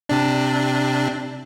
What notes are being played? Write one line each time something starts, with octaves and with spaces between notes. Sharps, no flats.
C3 D4